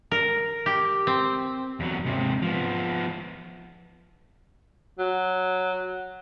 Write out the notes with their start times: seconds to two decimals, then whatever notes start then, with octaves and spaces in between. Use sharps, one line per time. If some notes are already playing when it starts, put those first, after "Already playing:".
0.11 A#4
0.66 G4
1.07 C4
1.80 E2 F#3
2.06 G#2 C3
2.42 F3 B3
4.99 F#3